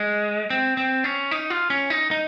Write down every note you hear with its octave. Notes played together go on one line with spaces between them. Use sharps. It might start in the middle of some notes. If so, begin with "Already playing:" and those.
Already playing: G#3
C4
C4
C#4
D#4
F4
C#4
D#4
D#4